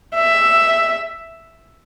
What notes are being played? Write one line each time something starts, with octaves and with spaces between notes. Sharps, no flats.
E5